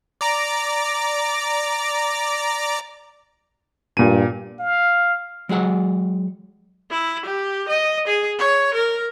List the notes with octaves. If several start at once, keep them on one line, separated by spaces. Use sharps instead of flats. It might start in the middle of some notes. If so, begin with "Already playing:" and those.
D5 A#5 D6
G2 A#2 D#7
F5
F#3 G#3 G#4 F#5
E4
G4
D#5
G#4
C#5
A#4